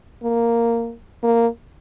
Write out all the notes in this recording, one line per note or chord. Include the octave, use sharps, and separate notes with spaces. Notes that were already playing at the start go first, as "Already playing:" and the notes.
A#3
A#3